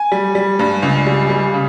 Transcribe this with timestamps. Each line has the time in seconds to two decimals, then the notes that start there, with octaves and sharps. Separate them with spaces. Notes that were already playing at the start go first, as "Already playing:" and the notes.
Already playing: G#5
0.12 G3
0.35 G3
0.59 G2
0.83 C#2
1.07 G3
1.30 G3
1.54 C#3